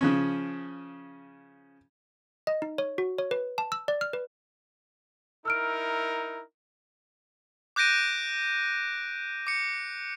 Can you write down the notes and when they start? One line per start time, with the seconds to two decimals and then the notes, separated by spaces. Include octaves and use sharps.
0.01 C#3 F3 C#4
2.47 D#5
2.62 D#4
2.78 C#5
2.98 F#4
3.18 C#5
3.31 B4
3.58 A5
3.72 E6
3.88 D5
4.01 F6
4.13 B4
5.45 D#4 E4 A#4 E6 F6 D7
7.76 D6 F#6 G6 A#6 D7 D#7
9.47 D6 C#7